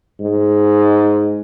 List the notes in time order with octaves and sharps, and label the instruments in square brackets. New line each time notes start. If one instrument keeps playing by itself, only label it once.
[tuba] G#2